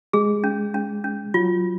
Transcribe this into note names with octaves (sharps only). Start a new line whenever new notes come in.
G#3 G#4
C#4
C#4
C#4
F#3 F4